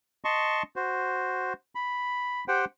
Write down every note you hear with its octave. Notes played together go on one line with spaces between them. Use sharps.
D#5 A5 C6 C#6
F#4 C5
B5
G4 C5 F#5 G5